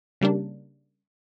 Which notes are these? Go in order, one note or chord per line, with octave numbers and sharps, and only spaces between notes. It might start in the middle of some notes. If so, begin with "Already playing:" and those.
C#3 G3 A#3 D4